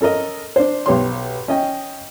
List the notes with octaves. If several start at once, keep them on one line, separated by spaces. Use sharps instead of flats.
C#4 A4 A#4 D#5
D4 C5
B1 G4 C#5 C6
C#4 D#5 G5